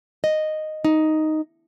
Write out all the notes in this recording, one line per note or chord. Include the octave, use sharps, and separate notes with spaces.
D#5
D#4